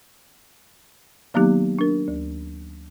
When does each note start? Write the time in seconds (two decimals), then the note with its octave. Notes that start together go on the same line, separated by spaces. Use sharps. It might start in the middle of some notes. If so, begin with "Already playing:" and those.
1.34 D#3 F#3 A#3 B3 D#4 G4
1.79 D4 A#4
2.08 D2